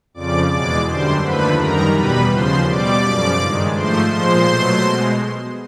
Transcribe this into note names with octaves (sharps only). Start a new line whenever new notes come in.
F2 C#3 F3 D5 D6
E2 B2 G#3 D5 D6
F#2 D3 G3 C5 C6
D#2 D3 F3 A3 B4 B5
F#2 D#3 G3 A#4 A#5
E2 B2 G3 B4 B5
D#2 C#3 F3 C5 C6
B2 G3 D5 D6
F#2 C#3 F3
G2 D#3 G#3
G#2 F3 A3 C5 C6
A#2 F3 G#3 C5 C6
B2 F#3 A3
B2 G#3